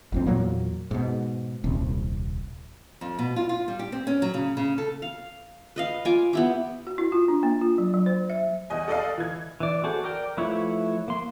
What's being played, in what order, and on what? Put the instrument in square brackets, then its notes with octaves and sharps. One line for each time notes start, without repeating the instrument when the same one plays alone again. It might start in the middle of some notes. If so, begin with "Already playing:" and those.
[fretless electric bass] G#1 F2 C4
E2 A#2 F#3 A#3
G#2 B2
D#1 C2
[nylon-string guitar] F2
B2
F4
F4
G3
G4
C4
C#4
F#3
C#3
C#3
A4
[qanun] F5
B4 D#5 F5
F4 G#5 D6
B3 E4 G4
[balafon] F#4
E4
F4
D4
A#3
F4
F#3
F#3
C5
E5
[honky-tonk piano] E2 D#5 G#5
A4 D5 D#5 F5
E3 G#6
[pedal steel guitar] E3 D5
F#4 G#4 A4 C5
A#4 D5 G5
F3 A3 E4 B4 C#5
A#3 C6